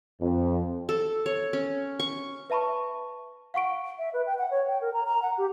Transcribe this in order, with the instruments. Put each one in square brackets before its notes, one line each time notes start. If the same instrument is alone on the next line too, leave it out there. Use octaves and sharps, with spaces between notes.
[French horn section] F2
[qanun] A4
C#5
C#4
C#6
[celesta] B4 E5 A5 B5 C#6
F5 F#5 C#6 D7
[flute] E5
B4
G5
F#5
C#5
G5
A#4
A#5
A#5
F#5
G4